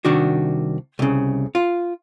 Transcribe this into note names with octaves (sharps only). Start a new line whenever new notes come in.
C2 D#3 D4 F#4
C2 C#3
F4